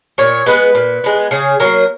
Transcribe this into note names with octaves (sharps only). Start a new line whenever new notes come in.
A#2 C#5
G#3 B3 B4
A#2
G#3 B3
C#3 G#4
F#3 A#3 A#4